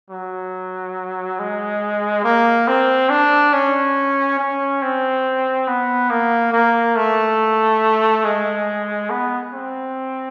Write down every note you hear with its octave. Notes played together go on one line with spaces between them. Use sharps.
F#3
G#3
A#3
C4
D4
C#4
C#4
C4
B3
A#3
A#3
A3
G#3
B3
C4